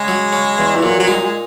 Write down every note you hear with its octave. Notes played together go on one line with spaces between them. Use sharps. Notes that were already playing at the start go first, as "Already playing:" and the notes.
Already playing: C#3 G#3
F#3
C#3
E2
E3
A#2 F#3
F#3
G#3 D#4
F#3
G#3